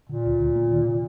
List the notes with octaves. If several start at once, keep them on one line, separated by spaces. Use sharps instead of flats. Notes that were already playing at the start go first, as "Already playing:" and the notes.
A#2 D3
D2
D2
A#3
D#3
C3